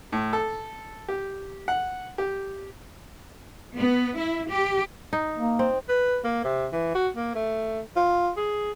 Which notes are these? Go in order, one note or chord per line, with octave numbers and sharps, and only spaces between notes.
A2
A4
G4
F#5
G4
B3
E4
G4
D#4
A#3
C4
B4
A#3
C3
E3
F#4
A#3
A3
F4
G#4